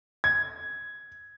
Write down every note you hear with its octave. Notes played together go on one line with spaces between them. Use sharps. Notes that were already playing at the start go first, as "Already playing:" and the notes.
G#6